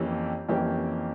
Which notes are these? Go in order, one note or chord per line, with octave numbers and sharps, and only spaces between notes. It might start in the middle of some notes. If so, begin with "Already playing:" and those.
Already playing: F2 E3 A#3 C#4 G4
F2 E3 A#3 C#4 G4